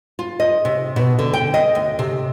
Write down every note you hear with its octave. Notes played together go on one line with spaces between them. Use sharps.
F4
D#5
C3
B2
D3
G5
D#5
D2
C3